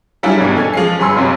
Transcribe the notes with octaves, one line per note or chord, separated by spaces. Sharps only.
F#3 G3 D4 E4 F4 G#4
G#1 G2 B2 D#3 E3 G3
C#4 A4 G#5
F3 G#3 C7
G1 F#2 G#4 B5 C6 E6
B1 F2 C3 F#3